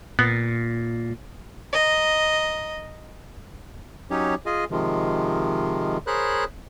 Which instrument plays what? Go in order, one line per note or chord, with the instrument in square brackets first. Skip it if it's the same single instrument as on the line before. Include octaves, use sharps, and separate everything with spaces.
[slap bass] A#2 [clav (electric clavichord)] B3
[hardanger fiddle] D#5 A#5
[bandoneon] F#3 C#4 D#4 G4 C#5
F4 G#4 D#5 G#5
C3 D#3 F3 G#3
G#4 A#4 C5 C#5 B5 F#6